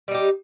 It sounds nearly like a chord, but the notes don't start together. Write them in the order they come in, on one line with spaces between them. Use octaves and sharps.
G3 D#4 G4